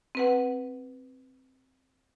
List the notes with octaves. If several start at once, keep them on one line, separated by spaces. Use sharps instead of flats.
C4 B4 F#5